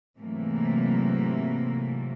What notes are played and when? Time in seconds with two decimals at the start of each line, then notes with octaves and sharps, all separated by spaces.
0.18 G#2 C3 E3 F#3 A3 A#3